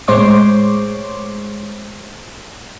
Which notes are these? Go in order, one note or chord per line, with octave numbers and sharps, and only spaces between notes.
A2 G#3 C5 C#5 C6 D6